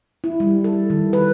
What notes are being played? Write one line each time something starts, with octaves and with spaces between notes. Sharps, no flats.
E4
G3
A4
D#3
B4